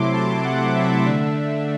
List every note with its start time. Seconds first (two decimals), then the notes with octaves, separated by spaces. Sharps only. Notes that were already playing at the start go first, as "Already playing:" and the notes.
Already playing: C3 F#3 A3 E4 C6 D6
0.13 A5
0.44 F#5
0.75 E5
1.05 D3 A3 D4 E5